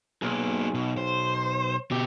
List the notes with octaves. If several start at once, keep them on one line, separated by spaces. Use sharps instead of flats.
B1 A#3 G#4
B2
C5
B2 G4